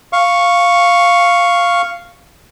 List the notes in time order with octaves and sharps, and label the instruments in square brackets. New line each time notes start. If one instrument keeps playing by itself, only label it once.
[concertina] F5 C#6